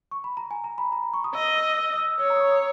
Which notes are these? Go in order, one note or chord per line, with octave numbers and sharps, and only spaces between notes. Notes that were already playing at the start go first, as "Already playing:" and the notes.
C#6
B5
A#5
G#5
A#5
B5
A#5
A#5
C#6
D#6
D#5 E6
E6
E6
D#6
E6
C#5 E6
A#5
D#6
C#6
D#6